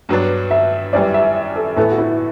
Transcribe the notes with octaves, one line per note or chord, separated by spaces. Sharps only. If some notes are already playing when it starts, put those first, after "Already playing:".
G2 F#3 B3 D4
E5
F#2 E3 G3 D5
E5
A4
A2 E3 B3 A4
F#4
E4